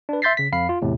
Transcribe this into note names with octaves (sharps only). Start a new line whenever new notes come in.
D4 B4
E5 C6 G6 A6 B6 C7
C#3 B6
F2 F5 B5 C7
F4
E2 A2 C3